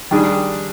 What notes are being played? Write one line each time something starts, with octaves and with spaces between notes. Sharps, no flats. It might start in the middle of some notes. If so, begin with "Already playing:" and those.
D#3 G3 D4 G#4